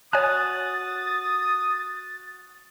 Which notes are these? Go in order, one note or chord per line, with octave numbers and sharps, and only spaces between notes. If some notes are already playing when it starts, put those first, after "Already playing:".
F#4 C#5 G#5 D#6 F#6 A6